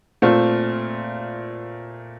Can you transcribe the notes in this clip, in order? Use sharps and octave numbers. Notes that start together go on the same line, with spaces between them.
A#2 A3 C4 F4